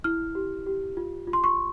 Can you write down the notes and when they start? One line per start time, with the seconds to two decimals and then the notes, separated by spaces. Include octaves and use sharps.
0.04 E4 F6
0.35 G4
0.66 G4
0.97 F4
1.27 F4
1.33 C6
1.44 C#6